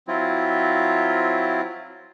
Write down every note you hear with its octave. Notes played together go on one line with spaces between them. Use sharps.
F#3 C4 E4 F4